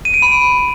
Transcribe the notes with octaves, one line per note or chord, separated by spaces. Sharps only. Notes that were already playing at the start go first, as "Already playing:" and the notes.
D#7
D7
B5